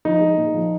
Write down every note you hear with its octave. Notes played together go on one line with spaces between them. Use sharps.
F3 D#4
G#3
A#2
F3